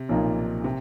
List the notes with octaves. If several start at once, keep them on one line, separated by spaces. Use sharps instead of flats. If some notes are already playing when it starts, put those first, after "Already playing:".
Already playing: C3
B1 A#2 F3 A#3 D#4
C3